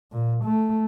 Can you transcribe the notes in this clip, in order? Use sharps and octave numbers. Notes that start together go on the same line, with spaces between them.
A#2
A3